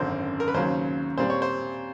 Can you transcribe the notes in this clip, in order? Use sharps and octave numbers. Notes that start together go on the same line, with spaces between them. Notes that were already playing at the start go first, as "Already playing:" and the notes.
Already playing: G#1 F#2 D3 C5
A#4
B4
D#2 C#3 F#3 C5
A#2 G3 C4 C5
C#5
C5